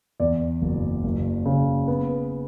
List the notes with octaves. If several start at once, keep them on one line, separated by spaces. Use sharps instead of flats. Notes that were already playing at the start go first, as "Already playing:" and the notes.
E2 D5
F#1
F#1
C#3
B3